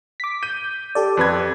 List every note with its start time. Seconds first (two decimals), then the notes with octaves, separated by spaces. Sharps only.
0.20 D6 B6
0.43 G6 D#7
0.95 G4 A4 D5
1.17 F2 B4 G#6